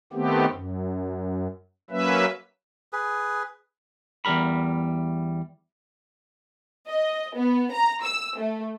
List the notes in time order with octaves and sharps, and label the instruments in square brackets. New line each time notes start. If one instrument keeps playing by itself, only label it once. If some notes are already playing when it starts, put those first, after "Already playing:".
[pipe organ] D#3 A3 B3 C4 G4
F#2
F#3 A#3 C#4 B4 E5
[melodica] G#4 B4
[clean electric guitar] E2 G2 G3 A#4 B5
[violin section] D#5
B3
A#5
E6
A3